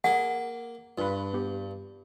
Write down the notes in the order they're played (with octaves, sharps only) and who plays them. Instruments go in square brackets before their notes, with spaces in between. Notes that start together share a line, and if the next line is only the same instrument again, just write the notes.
[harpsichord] A#3 D6 [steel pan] G#4 G#5 [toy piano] F#5
[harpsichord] G2 [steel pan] F4 B4
[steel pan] B3 G4